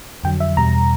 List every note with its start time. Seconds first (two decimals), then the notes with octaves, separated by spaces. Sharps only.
0.24 F2 D3 F#3 G5
0.40 E5
0.57 E2 B2 G3 A#5